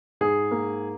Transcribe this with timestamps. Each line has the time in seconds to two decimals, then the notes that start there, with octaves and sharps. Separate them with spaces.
0.21 G#2 G#4
0.51 A#3